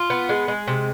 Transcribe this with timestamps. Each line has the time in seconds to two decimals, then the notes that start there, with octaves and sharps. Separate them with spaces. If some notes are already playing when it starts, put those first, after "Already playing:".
Already playing: F4
0.10 B3
0.29 G#3
0.48 G#3
0.67 C3